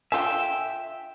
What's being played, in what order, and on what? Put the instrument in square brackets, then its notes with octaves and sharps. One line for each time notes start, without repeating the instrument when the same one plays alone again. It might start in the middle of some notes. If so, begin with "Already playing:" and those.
[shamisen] D3 F4 G#5 [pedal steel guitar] E5 G5